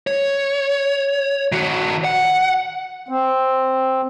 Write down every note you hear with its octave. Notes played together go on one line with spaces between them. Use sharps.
C#5
D#3 F#4
F#5
C4